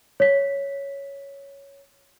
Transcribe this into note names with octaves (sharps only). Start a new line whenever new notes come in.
C#5 B6